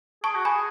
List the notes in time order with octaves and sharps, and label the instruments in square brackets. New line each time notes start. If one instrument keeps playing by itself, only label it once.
[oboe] G#4 [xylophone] A5 C#6
[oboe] F#4
[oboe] G#4 [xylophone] G#5 B5